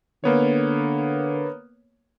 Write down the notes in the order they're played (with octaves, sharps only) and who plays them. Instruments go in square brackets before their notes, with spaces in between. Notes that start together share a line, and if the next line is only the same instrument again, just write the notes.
[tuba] D3 [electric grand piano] A#3 B3 C#5